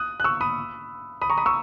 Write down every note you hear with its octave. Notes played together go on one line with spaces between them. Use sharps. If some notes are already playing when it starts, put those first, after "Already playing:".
Already playing: D#6 F#6
F#6
C#6 E6
B5 D#6
B5 D#6
A#5 C#6
B5 D#6
C#6 E6